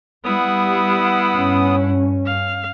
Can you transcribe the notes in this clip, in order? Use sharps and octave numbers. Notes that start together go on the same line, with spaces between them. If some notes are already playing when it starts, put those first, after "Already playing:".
G3 B3 E4 F#5 D#6
G2 C#4
F5